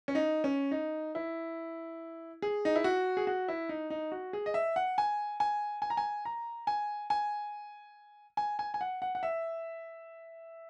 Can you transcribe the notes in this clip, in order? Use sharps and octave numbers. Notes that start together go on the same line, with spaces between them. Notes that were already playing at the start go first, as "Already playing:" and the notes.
C#4
D#4
C#4
D#4
E4
G#4
D#4
E4
F#4
G#4
F#4
E4
D#4
D#4
F#4
G#4
D#5
E5
F#5
G#5
G#5
G#5
A#5
G#5
A#5
G#5
G#5
G#5
G#5
G#5
F#5
F#5
F#5
E5